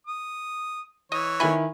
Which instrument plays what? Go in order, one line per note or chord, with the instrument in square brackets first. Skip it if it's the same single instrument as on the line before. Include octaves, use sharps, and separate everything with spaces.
[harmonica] D#6
[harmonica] E3 C#5 [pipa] D#5
[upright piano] D#3 E4 [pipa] B4 G#5